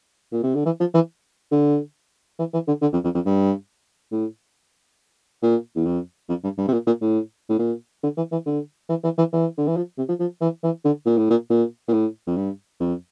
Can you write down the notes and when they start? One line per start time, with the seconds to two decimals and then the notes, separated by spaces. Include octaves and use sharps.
0.32 A#2
0.43 C3
0.55 D3
0.65 E3
0.80 F3
0.94 E3
1.52 D3
2.39 E3
2.53 E3
2.67 D3
2.82 D3
2.93 F2
3.04 F2
3.14 F2
3.25 G2
4.12 A2
5.42 A#2
5.75 E2
5.86 F2
6.29 F2
6.44 G2
6.58 G2
6.68 C3
6.73 A#2
6.87 A#2
7.01 A2
7.49 A2
7.59 A#2
8.03 D3
8.17 E3
8.32 E3
8.46 D3
8.89 E3
9.04 E3
9.18 E3
9.33 E3
9.58 D3
9.67 E3
9.76 F3
9.98 C3
10.08 F3
10.20 F3
10.41 E3
10.63 E3
10.85 D3
11.06 A#2
11.18 A2
11.30 A#2
11.50 A#2
11.88 A#2
11.93 A2
12.27 F2
12.36 G2
12.80 F2